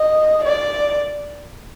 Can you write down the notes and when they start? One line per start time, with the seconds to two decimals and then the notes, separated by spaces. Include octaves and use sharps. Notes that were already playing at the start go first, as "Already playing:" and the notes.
Already playing: D#5
0.45 D5